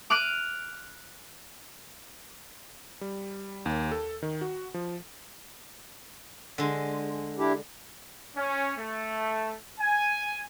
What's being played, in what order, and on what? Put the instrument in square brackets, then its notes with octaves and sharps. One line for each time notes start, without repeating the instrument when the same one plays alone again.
[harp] D6 F6 F#6 D7 D#7
[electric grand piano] G3
D#2
A4
D#3
F#4
F3
[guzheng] D3 G#3
[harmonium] D4 E4 G4
[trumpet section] C#4
A3
G#5